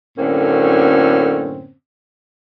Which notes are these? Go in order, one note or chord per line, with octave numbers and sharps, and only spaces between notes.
F#2 A2 D3 A#3 C4 C#4